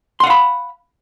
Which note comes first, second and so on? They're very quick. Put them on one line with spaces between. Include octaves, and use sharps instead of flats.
C6 F#5 F5 B5